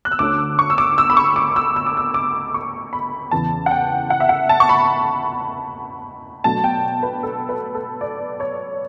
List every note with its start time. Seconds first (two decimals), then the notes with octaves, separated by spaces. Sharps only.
0.05 F#6
0.11 E6
0.19 D2 D3 A3 C#4 D6
0.59 C#6
0.70 E6
0.78 D6
0.98 E6
1.10 B5
1.17 C#6
1.36 D6
1.56 E6
1.76 E6
1.86 D6
1.97 E6
2.14 D6
2.54 C#6
2.93 B5
3.31 E2 C#3 E3 A5
3.66 F#5
3.71 G5
4.10 F#5
4.20 E5
4.29 F#5
4.49 A5
4.60 C#6
4.69 B5
6.44 B2 F#3 A3 D4 A5
6.64 G5
7.03 B4
7.23 A4
7.49 B4
7.75 A4
8.01 D5
8.40 C#5